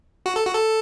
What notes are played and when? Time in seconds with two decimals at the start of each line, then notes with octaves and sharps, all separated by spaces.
0.26 F#4
0.36 A4
0.45 F#4
0.54 A4